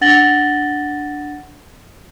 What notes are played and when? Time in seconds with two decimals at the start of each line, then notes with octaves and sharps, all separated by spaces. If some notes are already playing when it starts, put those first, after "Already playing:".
0.01 D4 F#5 A6 A#6 F#7 G7